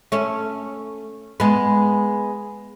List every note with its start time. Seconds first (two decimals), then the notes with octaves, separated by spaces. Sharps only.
0.12 A3 C#4
1.40 G#3 B3